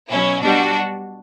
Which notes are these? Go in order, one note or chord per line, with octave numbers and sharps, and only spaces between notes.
B2 F#3 C#4 E4
B2 G3 D4 F#4